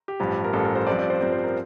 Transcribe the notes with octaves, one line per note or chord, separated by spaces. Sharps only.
G4
A1 G2 F3
A#4
A1 G2 F3 A4
A#4
C5
G2 F3 C4 D5
D5
C5
G2 F3 C4 D5
C5
A#4